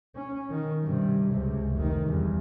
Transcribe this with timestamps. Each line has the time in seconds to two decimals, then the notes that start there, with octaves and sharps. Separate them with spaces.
0.15 C#4
0.50 D#3
0.84 G2 C3
1.30 C#2 C3
1.75 F1 D#3
2.06 E2 G2